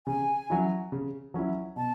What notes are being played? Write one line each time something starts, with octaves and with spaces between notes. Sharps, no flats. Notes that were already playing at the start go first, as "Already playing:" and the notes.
C#3 G#5
F#3 C#4 E4
C#3
F#3 C#4 E4
B2 A5